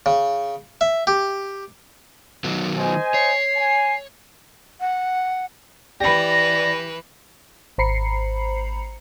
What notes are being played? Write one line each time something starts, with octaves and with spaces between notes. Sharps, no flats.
C#3
E5
G4
D#3 F#3 B3
C5 D#5 G#5
C#5 C7
G#5
F#5
E3 G4 B4 D5 B5 A#6
G#1 C5 A#5 B5 C7 C#7